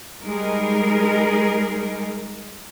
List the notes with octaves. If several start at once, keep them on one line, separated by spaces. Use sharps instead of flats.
G3 G#3 D#4 G#4 A#4